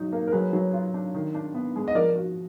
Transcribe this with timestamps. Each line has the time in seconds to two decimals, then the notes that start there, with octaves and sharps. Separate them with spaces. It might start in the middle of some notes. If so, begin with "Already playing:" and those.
Already playing: F#3 D#4 F#4
0.12 A#3
0.27 A#4
0.32 F#3 G#4 B4
0.53 F#3
0.73 F4
0.94 D4
1.14 D#3
1.35 D4
1.54 B3
1.76 G#3
1.88 D#5
1.95 F3 A#4 D5
2.16 F#4